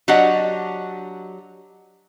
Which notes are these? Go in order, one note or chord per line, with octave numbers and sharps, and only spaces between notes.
F#3 D4 G4 D5 D#5 F#5